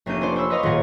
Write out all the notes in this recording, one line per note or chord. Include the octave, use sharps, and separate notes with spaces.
F1 A#3 C#4 D4 G6 D#7
C#4 D4 F4 C5 D5
C5 C#5 B5 E6
B4 C#5 D#5 F5 A#5 C6
D#1 G#2 F4 F#5 A#5 G#6